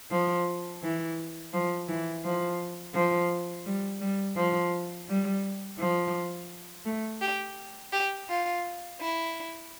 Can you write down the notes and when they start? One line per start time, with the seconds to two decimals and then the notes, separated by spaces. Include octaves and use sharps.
0.11 F3
0.82 E3
1.53 F3
1.88 E3
2.24 F3
2.95 F3
3.66 G3
4.01 G3
4.37 F3
5.08 G3
5.79 F3
6.85 A3
7.20 G4
7.92 G4
8.28 F4
8.99 E4